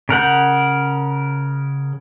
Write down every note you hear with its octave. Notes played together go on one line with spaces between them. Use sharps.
C#3 A#4 F#5 G6